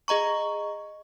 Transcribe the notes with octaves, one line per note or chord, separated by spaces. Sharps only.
G#4 D#5 A#5 C#6